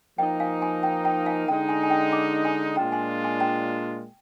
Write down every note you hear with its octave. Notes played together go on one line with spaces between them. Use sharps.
F3 A#3 D#4 D#5 G5
F5 G#5
G#5 C6
G5 A#5
G5 A#5
F5 G#5
D3 G#3 D#4 G5 A#5
G#5 C6
G#5
G5 A#5
A#5 D6
G#5 C6
A#2 G#3 D4 F4 G5 A#5
G#5 C6
G#5 C6
G5 A#5